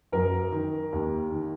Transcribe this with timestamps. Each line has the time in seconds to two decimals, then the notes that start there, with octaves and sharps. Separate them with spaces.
0.12 F#2 A#4
0.52 D#3
0.92 D#2
1.32 D#3